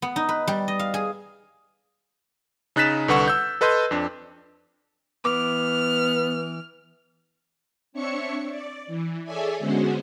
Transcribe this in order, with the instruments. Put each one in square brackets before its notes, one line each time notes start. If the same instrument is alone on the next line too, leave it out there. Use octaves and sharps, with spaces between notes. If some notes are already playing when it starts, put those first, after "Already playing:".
[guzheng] B3
D#4
B4
G3
D#5
F5
G#4
[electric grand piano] C#3 D#4 F#6 A6 B6 E7
C2 D3 B4 F#5 C#6 E7
E6 G6
A4 B4 D#5 C6 G6
F2 D4
[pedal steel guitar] E3 D6 [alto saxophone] B3 [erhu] F6
[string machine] C4 D4 C#5 E5 C#6 C#7
D5
E3
G#4 A4 C#5 D5 E5 G#5
D3 G#3 B3 C#4 F#4 C5